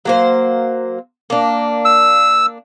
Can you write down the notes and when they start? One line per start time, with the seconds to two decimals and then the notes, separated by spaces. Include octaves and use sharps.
0.05 F#3 A#3 C5
1.30 A#3 D4
1.85 E6